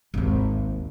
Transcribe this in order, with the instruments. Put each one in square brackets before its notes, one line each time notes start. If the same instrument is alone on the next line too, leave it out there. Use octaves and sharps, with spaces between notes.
[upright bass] G#1 D#2